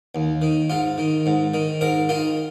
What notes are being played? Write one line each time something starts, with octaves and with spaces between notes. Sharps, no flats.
D#2
D#3
G#2 F4
D#3
G#2
D#3
G#2 A#4
D#3 F4